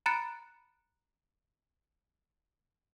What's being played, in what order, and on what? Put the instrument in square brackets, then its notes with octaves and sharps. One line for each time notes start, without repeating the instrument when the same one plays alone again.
[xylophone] A#5 B5 F#6 A6 C#7 D7